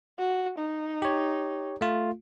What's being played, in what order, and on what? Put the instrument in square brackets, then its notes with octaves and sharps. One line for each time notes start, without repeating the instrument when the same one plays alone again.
[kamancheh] F#4
D#4
[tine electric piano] G4 C#5
A3 F4